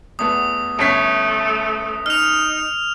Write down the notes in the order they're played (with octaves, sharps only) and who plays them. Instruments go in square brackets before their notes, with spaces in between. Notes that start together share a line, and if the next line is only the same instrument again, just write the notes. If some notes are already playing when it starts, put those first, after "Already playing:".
[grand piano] E2 A3 B3 [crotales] D#6
[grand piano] G1 C#4 B6 [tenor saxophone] A3
[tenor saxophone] D#4 [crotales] F6 F7